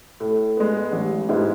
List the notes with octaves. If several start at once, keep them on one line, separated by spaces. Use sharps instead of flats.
A2
G#3 B3
A1
G#2 G#3 B3 E4